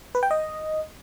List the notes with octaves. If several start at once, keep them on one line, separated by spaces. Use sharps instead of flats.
B4
G5
D#5